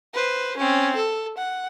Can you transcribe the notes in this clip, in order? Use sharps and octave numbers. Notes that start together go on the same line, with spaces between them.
B4 C5
C4 C#4
A4
F#5